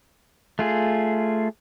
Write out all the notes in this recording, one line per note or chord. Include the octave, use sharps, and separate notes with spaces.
A3 F4 G#4